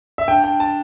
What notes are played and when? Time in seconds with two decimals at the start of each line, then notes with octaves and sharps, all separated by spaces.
0.18 E5
0.28 D4 G5
0.44 G5
0.60 A5